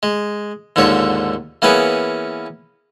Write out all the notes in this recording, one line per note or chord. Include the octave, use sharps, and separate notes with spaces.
G#3
D#2 G#2 D3 F3 C#5
E3 A#3 B3 C#4 G#4 B4